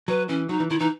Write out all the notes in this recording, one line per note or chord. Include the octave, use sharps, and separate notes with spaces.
F#3 B4
E3 C#4
F#3 D#4
E3
D#3 E4
E3 D#4